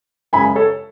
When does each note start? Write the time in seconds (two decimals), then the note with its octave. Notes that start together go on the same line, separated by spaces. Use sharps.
0.33 F#2 C#3 G#3 C#4 G#5 B5
0.55 A4 C#5